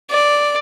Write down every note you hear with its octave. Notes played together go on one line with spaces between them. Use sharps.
D5